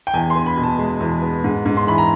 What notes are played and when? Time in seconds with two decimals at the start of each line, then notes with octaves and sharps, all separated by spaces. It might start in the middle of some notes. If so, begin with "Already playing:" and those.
0.07 G5
0.14 E2 G#5
0.30 C6
0.35 B3
0.46 B5
0.57 B2
0.63 A5
0.79 G#3
1.00 E2
1.22 B3
1.44 G#2
1.65 G#2
1.77 C6
1.87 E3 B5
1.98 A#5